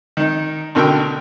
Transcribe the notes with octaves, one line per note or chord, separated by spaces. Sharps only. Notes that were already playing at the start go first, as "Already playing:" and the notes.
D#3 D#4
A1 B2 D3 A#4 G5 E6